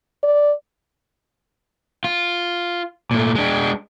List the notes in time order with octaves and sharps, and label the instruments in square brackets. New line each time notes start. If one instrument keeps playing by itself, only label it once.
[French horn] D5
[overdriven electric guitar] F4
A#2 A3
G#3 D4